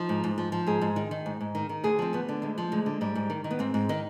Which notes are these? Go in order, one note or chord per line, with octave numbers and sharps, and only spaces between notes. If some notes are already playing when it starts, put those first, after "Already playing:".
Already playing: F3 D#4
G#2
G#2
F3
F3
G#2 G#4
G#2
D#3
D#3
G#2
G#2
D#3
D#3
D2 G#4
F3 C4
D2 B3
D3
D2 G#3
F3
D2 G#3
D3
G#2 G3
G#2
D#3
D#3
B3
G#2 C4
G#2
D#3 D#4